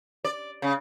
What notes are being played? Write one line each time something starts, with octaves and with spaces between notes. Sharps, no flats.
D5
C#3